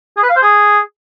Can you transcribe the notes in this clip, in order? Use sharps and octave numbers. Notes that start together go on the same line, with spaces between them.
G#4
B4
F5
C5
G#4